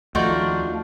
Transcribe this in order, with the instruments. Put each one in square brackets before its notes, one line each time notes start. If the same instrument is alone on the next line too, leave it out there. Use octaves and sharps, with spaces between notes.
[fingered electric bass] D#2 F3 [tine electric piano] A3 G6 [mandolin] D4 D#4 F4 [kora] F#4